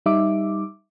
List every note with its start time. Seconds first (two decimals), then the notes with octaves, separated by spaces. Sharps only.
0.06 G3 D#4 E5 D6